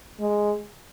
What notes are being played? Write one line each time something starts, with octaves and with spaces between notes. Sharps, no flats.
G#3